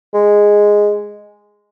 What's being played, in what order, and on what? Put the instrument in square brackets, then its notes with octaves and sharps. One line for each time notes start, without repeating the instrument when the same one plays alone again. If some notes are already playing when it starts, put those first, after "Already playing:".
[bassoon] G#3